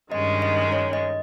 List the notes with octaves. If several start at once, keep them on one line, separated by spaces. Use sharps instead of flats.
G2 D#3 G#3 C#4 D#5
D#5
C#5
D#5